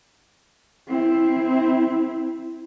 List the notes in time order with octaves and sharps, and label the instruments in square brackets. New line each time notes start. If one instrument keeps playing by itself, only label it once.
[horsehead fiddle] C4 E4